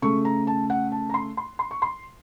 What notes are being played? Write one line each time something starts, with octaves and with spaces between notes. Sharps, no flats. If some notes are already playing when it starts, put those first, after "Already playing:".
C#3 A3 C#6
A#5
A5
F#5
A5
A#5
C6
C6
C6
C#6
C6